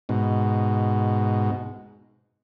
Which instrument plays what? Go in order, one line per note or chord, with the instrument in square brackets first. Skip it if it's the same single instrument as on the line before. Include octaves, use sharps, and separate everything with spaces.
[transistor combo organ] G#2 B2